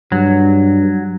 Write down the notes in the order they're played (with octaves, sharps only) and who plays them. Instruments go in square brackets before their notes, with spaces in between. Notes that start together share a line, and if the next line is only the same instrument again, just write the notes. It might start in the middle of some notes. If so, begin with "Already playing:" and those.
[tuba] G2 [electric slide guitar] F#3